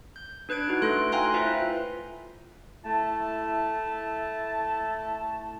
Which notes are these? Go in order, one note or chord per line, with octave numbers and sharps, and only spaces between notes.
G6
D4 B4 F#6 G#6 D7
D#4 E4 F#4
A3 A4 C6 F#6 D7
F5 G5 G#5 A#5 C6 F#6
E4 F4 B4 C5 E5
A3 E4 A5